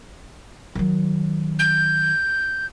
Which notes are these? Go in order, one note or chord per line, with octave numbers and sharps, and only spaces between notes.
D#3 F#3
G6